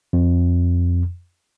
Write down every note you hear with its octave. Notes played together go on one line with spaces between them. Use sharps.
F2